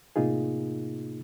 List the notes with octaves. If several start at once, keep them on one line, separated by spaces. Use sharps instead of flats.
A2 C3 A#3 D#4 F4 G#4